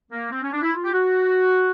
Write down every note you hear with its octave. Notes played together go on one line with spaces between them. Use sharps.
A#3
C4
C#4
D4
E4
F4
G4
F#4